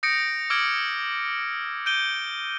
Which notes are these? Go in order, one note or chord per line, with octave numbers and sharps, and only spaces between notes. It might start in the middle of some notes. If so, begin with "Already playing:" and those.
D#6 G6 A#6 C#7 D7
D6 E6 F6 G#6 D7
G6 D7 D#7 G7